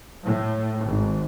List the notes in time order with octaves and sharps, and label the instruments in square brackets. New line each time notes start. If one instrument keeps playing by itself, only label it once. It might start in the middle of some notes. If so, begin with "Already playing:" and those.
[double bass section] A2
G#1